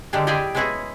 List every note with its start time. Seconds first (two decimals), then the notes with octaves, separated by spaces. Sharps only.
0.13 D3 D#3 G3 G#3 D4
0.27 E4 G4 G#4 D5 D#5
0.55 G#3 B3 C#4 E4 F#4 G#4